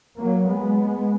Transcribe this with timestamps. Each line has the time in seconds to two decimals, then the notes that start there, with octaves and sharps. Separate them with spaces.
0.18 F#3 A#3
0.48 G#3 B3